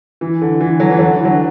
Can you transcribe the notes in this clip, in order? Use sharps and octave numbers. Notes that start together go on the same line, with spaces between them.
E3
D3
E3
D3 F#3
E3
D3 F#3
E3
D3 F#3